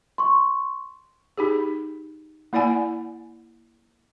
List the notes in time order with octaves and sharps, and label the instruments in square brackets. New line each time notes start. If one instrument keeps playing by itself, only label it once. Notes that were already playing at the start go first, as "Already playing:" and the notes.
[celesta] C6 C#6
[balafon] D#4 G4 G#4
A#3 E4 D5 F#5 G#5